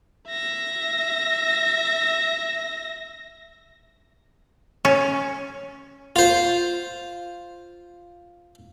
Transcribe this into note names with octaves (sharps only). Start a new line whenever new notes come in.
E5 A#6
C#4
F4 C5